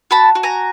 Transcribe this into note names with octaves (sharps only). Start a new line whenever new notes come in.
F#4 A5 B5
F#4
G#5 A#5